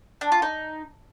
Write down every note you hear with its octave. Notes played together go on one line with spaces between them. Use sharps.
D4
F4
D#4